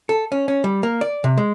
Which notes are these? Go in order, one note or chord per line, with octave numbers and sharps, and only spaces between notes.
A4
C#4
C#4
G3
A#3
D5
C3
G#3